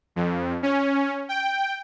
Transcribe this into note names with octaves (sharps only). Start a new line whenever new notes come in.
F2
C#4
G5